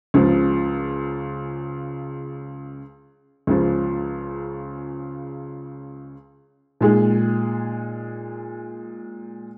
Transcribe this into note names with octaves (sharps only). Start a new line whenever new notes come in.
C#2 C#3 F3
C#2 C#3 F3
A#2 G#3 D#4 G#4